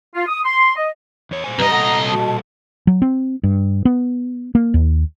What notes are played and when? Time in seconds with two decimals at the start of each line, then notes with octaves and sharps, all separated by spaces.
0.15 F4
0.27 D#6
0.45 C6
0.76 D#5
1.31 E2 C#5
1.44 A#2 C5 G#5
1.59 C2 G2 G3 B4 D#5 A#5
1.71 A#2 G3 A4 F#5 A#5
2.08 B2 A5
2.87 F#3
3.02 C4
3.43 G2
3.85 B3
4.55 A#3
4.74 D#2